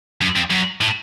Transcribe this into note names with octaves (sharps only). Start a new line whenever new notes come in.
F#2
F2
F#2
A2